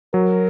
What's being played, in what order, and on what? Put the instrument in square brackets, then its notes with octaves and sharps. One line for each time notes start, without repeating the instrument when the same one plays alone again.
[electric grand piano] F#3 [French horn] A#4